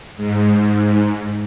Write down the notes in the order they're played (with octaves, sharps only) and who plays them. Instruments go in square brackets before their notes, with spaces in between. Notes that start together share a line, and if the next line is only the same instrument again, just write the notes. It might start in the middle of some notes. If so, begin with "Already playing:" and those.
[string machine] G#2